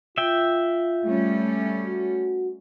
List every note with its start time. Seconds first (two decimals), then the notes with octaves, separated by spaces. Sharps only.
0.18 F4 E5 G5
1.05 G3 A3 C#4
1.83 F#4